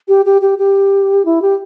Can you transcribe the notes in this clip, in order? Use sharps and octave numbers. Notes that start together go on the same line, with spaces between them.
G4
G4
G4
G4
E4
G4